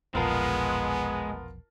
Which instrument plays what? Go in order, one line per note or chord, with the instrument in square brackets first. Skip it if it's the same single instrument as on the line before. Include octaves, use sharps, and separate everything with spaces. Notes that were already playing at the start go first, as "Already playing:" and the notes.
[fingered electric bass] E1 A#1 [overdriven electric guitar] G#3 [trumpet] B3 [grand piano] F4 A#4 A5